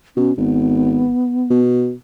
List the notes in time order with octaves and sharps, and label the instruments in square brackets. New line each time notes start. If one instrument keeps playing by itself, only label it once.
[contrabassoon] B2 [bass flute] C#4
[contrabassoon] G#1 [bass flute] B3
[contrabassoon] B2